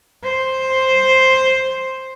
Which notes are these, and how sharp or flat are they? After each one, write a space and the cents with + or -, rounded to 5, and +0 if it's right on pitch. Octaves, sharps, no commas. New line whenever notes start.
C5 +5